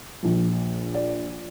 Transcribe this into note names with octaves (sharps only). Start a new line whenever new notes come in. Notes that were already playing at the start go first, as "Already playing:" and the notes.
A#1 A#2 F3
D5